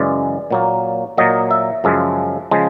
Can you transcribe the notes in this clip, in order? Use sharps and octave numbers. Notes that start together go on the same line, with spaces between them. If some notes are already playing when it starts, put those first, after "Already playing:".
Already playing: F#2 C#3 E3 G#3 D5
A#2 F#3 A#3
A#2 F#3 A#3 D#5
E5
F#2 C#3 F3 G#3
C#3 F3 G#3